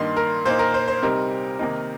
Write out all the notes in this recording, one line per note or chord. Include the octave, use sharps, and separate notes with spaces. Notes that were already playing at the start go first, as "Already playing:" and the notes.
Already playing: G2 D#3 A#3 D#4 C6
A#4
A#2 A#3 D#4 C5
A#4
C5
C5
C3 G3 C4 D#4 A#4
C3 D#3 A#3 D#4